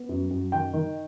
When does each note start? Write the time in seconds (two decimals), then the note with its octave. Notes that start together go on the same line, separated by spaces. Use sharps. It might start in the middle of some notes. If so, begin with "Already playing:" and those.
Already playing: B3
0.09 F#2
0.30 F#2
0.52 D#3 G5
0.74 D#3